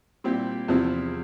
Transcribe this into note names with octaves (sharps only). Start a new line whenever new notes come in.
A#2 G3 C4 E4 G4
E2 C3 F3 C4 E4